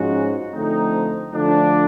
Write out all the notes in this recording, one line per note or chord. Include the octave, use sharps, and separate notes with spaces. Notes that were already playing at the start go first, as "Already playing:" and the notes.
Already playing: G#2 F3 G#3 C#4 F#4
D3 F3 A3 C4 D#4
D3 F3 A3 D4